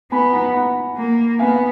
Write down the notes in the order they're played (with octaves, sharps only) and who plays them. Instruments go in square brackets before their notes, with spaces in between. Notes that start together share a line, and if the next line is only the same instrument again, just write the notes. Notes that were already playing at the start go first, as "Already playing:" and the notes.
[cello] B3 [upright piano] G#5 B5
[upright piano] F#5 A#5
F#5 A#5
[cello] A#3
[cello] B3 [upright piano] F5 G#5